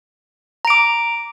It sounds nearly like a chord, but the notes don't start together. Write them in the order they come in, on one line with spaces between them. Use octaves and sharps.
A#5 D7 D6